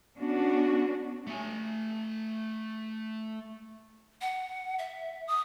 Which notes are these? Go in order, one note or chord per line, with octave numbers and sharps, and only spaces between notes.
B3 C#4 D4 F#4
A3 G#5
F#5
E5
D#6